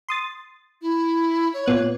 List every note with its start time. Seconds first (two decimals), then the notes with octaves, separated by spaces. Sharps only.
0.09 C6 D#6 A6
0.82 E4
1.54 C#5
1.66 A#2 B3 F#6